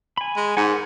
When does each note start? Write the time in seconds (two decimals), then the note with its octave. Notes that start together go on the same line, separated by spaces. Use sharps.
0.17 G#5 B5
0.36 G#3
0.57 G#2 F#5 G#5
0.70 A#4